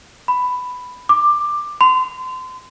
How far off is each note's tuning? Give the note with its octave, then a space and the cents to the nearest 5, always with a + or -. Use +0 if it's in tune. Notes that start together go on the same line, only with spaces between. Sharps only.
B5 +10
D6 +15
C6 -35